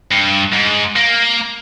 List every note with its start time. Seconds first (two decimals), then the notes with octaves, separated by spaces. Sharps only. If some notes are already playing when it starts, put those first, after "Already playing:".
0.12 G2
0.53 G#2
0.96 A#3